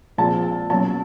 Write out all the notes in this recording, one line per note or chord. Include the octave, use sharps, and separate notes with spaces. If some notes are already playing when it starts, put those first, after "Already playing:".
A#2 F3 G#3 C4 A5
B2 F#3 A#3 C#4 A5